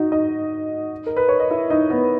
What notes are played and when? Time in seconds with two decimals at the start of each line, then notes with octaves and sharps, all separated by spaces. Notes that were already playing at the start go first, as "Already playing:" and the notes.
Already playing: D#4 F#4 D#5
0.12 D#4 D#5
1.06 A#4
1.17 B4
1.29 C#5
1.40 D#5
1.51 E4 E5
1.70 D#4 D#5
1.90 B3 B4